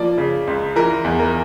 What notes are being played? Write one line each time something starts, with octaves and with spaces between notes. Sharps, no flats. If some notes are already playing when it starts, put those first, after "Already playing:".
Already playing: F3 A#3 D5
C#3
C#2
E3 A#4
E2
A#4